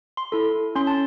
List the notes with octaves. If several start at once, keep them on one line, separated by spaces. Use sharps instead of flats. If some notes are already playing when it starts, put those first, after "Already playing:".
C6
E4 A4
C#4 C6
A5